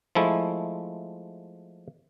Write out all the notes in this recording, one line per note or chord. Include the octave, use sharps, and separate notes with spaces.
F3 G#3 A3 E4